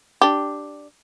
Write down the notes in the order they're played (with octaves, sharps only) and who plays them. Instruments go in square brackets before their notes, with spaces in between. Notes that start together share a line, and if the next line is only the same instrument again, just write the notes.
[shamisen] D4 G4